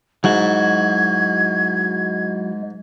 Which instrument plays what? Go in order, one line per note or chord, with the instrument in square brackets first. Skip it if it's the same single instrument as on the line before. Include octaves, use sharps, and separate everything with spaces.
[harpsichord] G#2 [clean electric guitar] F#3 E4 F#4 [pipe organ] G#3 [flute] G#6